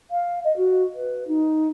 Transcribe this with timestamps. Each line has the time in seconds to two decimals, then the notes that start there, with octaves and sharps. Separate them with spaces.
0.10 F5
0.44 D#5
0.56 F#4
0.94 B4
1.27 D#4